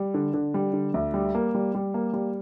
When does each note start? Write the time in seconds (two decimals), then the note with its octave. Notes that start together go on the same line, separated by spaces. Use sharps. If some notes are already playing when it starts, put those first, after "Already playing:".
Already playing: G3
0.14 D3
0.34 D3
0.54 G3
0.73 D3
0.94 D2
1.14 G3
1.35 A#3
1.55 G3
1.75 G3
1.94 A#3
2.13 G3